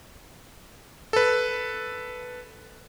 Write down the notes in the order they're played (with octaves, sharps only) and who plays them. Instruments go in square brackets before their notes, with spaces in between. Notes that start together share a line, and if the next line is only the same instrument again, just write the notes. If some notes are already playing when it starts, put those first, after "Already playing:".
[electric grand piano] A4 B4